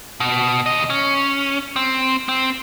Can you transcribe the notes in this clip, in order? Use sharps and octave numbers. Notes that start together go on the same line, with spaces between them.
B2
D#2 D#5
C#4
C4
C4